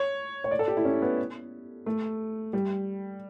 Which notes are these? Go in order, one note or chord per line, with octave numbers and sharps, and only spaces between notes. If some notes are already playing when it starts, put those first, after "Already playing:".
Already playing: C#5
C#5
D5
A4
G4
E4
C#4
B3
A3
G3